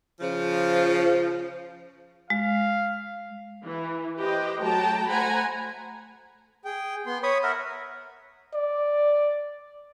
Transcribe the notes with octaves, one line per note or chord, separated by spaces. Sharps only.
C#3 F3
G#3 F5
E3
G4 B4 C5 D#5 G5
F#3 A3 G5 A5 A#5
A3 C5 F#5 G#5 A#5 B5
G#4 G5
B3 C6
C#5 B5 C#6 D#6
A#4 E5 F#5
D5